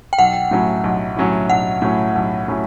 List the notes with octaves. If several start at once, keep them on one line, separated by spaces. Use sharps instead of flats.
G5
B1 F#5
A2 F#3 C#4 E4
B1
A2 F#3 C#4 E4
B1 F#5
A2 F#3 C#4 E4
B1
A2 F#3 C#4 E4